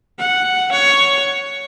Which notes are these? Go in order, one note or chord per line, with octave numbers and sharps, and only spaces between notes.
F#5
C#5